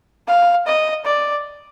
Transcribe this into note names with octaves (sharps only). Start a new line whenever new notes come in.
F5
D#5
D5